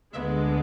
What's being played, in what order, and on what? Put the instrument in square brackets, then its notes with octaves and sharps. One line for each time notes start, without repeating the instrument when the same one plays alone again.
[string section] D2 D3 G#3 B3 E5